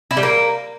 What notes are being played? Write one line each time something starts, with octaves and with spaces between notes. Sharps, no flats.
E4
G3
A#3